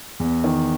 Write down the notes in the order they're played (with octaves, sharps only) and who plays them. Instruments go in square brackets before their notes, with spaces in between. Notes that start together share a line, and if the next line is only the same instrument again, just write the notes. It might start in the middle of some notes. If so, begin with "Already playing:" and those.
[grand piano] E2
D#3